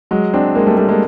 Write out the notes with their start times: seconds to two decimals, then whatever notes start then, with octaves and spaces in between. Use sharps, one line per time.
0.11 F#3 G#3
0.34 C4 D4
0.55 G#3 A#3
0.67 G3 A3
0.77 G3 A3
0.89 G#3 A#3